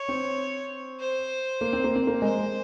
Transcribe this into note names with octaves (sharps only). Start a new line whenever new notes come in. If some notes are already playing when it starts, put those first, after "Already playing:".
Already playing: C#5
C4
C5
A#3
C4
A#3
C4
A#3
G#3 C5